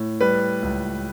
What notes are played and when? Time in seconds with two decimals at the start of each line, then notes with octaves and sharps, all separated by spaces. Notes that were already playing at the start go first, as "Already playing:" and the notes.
Already playing: A2
0.21 G3 B4
0.63 C#2